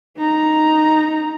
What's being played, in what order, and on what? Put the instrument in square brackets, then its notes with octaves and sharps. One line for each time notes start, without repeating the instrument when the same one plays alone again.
[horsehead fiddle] D#4 A#5